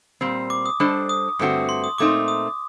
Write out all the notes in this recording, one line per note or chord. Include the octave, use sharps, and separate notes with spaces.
A#2 G3 C4
D6
D#6
G3 D4 A4 C5 D#5
D#6
G2 D3 A3 C4 F#4
C6
D#6
A#2 A3 C4 D#4 D6
D#6